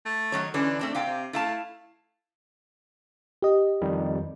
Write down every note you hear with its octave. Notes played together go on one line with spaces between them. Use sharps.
A3
D#3 F#3 C#5
D3 E3 C#4 D4
A3 C4 D4
C3 G4 F5 G5
A3 E4 F5 A5
G4 D#5
F2 D#3 G3